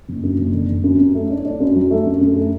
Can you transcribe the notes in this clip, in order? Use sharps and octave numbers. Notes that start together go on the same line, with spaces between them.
F#1
F#2
F#1
D3
D3
F#2
F#2
A3
D4
D4
F#2
F#3
A3
F#2
F#2
A3